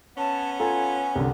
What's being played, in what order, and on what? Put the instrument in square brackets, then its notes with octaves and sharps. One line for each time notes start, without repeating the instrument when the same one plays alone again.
[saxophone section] B3 C#4 [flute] A5
[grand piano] F4 A4 A#5 [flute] G#5
[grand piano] C2 D3